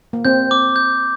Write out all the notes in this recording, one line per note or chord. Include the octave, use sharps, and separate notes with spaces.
A#3
C4 G6
D6
G6